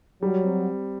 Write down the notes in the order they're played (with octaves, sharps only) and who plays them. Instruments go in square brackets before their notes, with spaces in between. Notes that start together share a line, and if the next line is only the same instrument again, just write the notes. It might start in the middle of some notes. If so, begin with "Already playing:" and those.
[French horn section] F#3 [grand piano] G3
[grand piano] C4